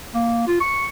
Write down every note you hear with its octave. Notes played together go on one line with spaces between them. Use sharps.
A#3
F4
C#6